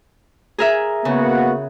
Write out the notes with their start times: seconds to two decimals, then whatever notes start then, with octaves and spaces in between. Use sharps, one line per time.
0.58 G#4 A#4 E5
1.05 C#3 A#3 B3 F#4